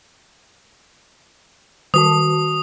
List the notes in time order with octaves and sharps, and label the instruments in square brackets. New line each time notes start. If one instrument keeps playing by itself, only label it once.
[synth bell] D#3 F#4 A5 [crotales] D#6